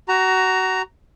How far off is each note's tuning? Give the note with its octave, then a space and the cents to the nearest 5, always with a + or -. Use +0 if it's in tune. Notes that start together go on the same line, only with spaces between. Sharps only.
F#4 +25 A#5 +0